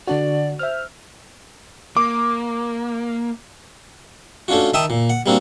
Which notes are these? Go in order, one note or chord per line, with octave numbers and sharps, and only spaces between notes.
D3 D4 F#4 D5
C5 E5 F6
A#3 D6
A3 C#4 D4 F4 F#4
D#3 E5 G5 A5 D#6
A#2
F#5
G3 A#3 C4 D4 F#4